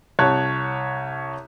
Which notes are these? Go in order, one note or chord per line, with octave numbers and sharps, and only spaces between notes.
C2 C#5 A5 F#6